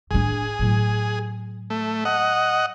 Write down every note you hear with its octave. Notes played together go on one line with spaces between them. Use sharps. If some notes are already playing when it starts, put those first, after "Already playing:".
A2 D4 G#4
A2 F#3
A3
D#5 F#5